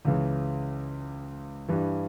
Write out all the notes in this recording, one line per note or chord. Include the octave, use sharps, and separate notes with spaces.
C#2 C#3 E3
G2 E3 G3